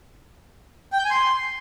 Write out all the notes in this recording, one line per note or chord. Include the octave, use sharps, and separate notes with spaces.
G5
G6
G#5
C6